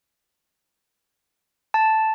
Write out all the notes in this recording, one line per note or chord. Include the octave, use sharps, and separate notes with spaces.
A5